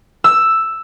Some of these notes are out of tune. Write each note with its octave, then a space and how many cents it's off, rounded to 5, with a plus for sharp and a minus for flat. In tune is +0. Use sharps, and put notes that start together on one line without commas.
E6 +5